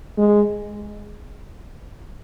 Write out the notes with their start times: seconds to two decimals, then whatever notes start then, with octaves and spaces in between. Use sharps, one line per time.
0.18 G#3